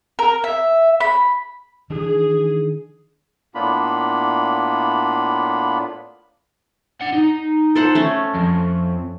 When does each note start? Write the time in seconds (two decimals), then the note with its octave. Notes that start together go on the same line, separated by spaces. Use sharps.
0.19 A#4
0.44 E5
1.00 B5
1.90 D#3 E3 D4 G#4
3.55 A2 A#3 B3 D4 F4 B5
7.01 D4 F#5
7.13 D#4
7.75 A4 C5 F#5
7.95 A3 C#4
8.35 F2